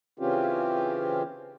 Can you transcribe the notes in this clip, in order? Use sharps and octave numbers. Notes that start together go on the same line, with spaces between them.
C#3 E3 C4 C#4 F4 G4